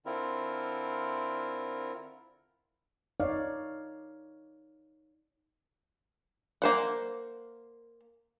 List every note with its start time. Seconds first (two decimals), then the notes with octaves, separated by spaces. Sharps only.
0.06 D3 C4 E4 F4 A#4
3.20 D#4 C#5 D5 F5
6.62 A#3 C5 F#5